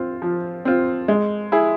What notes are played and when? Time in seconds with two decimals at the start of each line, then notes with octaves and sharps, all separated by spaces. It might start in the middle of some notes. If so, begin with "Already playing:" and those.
Already playing: C4 F4
0.22 F3
0.65 C4 F4
1.08 G#3
1.52 E4 G#4